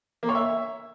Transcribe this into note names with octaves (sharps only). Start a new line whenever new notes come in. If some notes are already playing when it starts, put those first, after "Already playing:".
A#3
C#5
E5